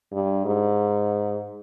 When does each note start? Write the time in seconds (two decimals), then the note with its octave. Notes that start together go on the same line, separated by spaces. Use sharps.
0.12 G2
0.45 G#2